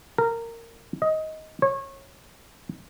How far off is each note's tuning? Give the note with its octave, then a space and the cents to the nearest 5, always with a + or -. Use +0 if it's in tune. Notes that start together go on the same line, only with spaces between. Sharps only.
A#4 -15
D#5 +15
C#5 -25